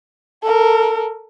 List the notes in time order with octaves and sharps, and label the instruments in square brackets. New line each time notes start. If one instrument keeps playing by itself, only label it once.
[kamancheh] A4 A#4